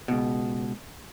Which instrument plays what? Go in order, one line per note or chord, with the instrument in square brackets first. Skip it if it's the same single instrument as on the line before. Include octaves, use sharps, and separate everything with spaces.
[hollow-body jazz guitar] C#2 B2